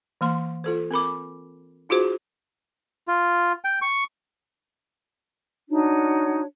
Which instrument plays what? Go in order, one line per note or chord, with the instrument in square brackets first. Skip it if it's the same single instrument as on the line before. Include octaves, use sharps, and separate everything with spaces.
[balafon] E3 A#3 C6
F4 A4 C5
C4 A#4 B5 D6
D#4 F4 F#4 G#4 C5
[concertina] F4
G5
C#6
[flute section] D4 D#4 F#4 C#5